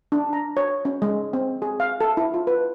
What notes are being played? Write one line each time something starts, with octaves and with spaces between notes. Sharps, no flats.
D4
A#5
C#5
C#4
G#3
C4
G#4
F5
A4
E4
F4
B4